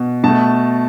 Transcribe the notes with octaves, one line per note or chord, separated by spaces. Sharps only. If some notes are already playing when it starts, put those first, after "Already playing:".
Already playing: B2
B2 A3 A5